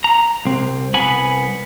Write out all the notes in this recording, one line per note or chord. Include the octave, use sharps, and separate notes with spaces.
A#5
C2 C4
C2 B3 B4 F#5 G#5 B5